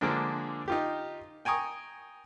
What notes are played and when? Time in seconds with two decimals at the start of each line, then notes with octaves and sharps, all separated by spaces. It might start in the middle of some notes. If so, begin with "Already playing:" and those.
0.01 D3 F3 G#3 A#3 D4
0.68 D#4 F4 G4
1.45 G5 G#5 A#5 C#6 D#6